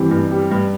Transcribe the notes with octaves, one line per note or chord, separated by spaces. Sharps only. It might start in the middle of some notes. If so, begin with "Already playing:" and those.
Already playing: G2 E3 G3 C4
G2
G3
G2